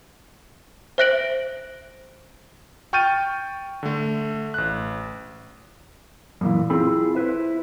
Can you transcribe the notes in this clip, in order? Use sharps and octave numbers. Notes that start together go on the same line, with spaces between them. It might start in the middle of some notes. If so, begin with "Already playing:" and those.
C5 E5 F#6 A#6 D7 F#7
G5 C#6 F6 G6 A6 D#7
D3 A3
A1 F#6
F#2 A#2 E3
C4 E4 F4 G#4 A4 B5
E4 B4 C5 E5